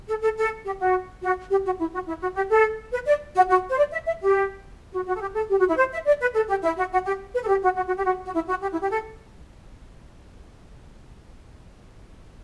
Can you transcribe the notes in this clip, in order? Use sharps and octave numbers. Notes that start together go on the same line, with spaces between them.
A4
A4
A4
G4
F#4
F#4
G4
F#4
E4
F#4
E4
F#4
G4
A4
B4
D5
F#4
F#4
C5
D5
E5
E5
G4
F#4
F#4
A4
G4
A4
G4
F#4
E4
C5
E5
D5
B4
A4
G4
E4
F#4
F#4
G4
B4
A4
G4
F#4
F#4
F#4
G4
F#4
F#4
E4
F#4
G4
E4
G4
A4